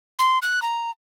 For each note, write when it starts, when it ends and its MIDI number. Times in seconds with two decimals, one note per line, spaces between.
0.19 0.39 84
0.42 0.62 90
0.62 0.91 82